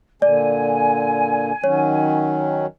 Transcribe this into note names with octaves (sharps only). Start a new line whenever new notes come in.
A#2 D3 D5 G#5
D#3 F#3 C#4 C#5